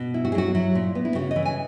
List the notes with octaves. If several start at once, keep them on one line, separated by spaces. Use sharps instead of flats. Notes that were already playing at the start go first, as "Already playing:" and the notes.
Already playing: B2
E4
F#4
G#4
F#3 F#4
F#3 E4
A#2
B3
E4
C#3 F#4
D#5
E3
G#5